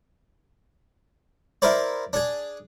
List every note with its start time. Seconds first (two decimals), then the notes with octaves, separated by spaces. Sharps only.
1.62 E4 A#4 C5 D5
2.13 D4 G#4